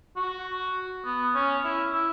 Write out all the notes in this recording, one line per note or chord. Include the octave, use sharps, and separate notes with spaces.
F#4
B3
C#4
E4
E4